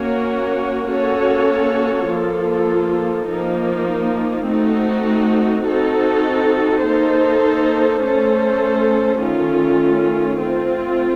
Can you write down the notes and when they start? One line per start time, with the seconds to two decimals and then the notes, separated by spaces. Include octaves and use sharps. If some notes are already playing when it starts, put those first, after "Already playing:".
Already playing: A#3 C#4 F#4 A#4 C#5
0.90 A#3 C#4 F#4 A4 C#5
2.09 F3 A#3 F4 A4
3.28 F3 A#3 D#4
4.47 A3 C4 D#4 F#4
5.64 C4 D#4 F#4 A4
6.84 A#3 D#4 A4 C5
8.02 A3 C#4 A4 C5
9.21 D#3 A3 C#4 F4
10.40 A3 C4 F4